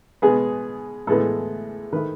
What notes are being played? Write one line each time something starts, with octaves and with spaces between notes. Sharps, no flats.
B2 G#3 B3 G#4
A2 E3 G#3 B3 A4
D#3 A3 B4